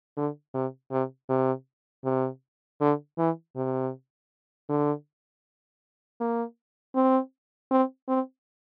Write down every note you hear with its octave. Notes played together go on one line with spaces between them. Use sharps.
D3
C3
C3
C3
C3
D3
E3
C3
D3
A#3
C4
C4
C4